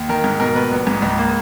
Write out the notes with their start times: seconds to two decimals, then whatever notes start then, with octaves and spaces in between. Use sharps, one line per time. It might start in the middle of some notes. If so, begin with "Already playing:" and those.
Already playing: D#2
0.09 D#3 A#4
0.24 G#2
0.40 B2 A#4
0.55 B2 B4
0.72 A#1
0.87 G#2
1.02 C#2
1.18 A#3